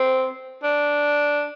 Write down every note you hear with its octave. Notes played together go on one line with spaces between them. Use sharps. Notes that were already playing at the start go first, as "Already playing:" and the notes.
Already playing: C4
D4